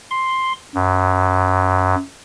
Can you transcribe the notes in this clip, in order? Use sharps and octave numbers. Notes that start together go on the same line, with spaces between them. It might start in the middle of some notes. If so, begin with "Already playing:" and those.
C6
F#2